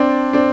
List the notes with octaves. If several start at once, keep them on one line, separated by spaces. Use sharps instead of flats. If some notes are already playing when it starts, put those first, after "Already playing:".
Already playing: C4 D4
C4 D4